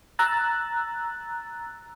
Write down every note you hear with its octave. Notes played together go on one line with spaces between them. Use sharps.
A#5 E6 F#6 A6